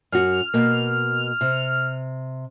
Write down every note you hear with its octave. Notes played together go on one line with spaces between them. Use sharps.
F#2 F#4 F6
B2 A#3
C3